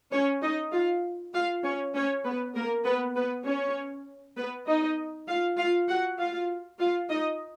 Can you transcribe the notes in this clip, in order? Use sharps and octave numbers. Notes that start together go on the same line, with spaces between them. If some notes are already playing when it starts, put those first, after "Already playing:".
C#4 C#5
D#4 D#5
F4 F5
F4 F5
C#4 C#5
C#4 C#5
B3 B4
A#3 A#4
B3 B4
B3 B4
C#4 C#5
B3 B4
D#4 D#5
F4 F5
F4 F5
F#4 F#5
F4 F5
F4 F5
D#4 D#5